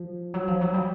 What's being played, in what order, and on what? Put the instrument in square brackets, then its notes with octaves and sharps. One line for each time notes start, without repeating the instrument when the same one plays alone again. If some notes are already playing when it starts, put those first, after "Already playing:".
Already playing: [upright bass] F3
F#3
F3
F#3
G3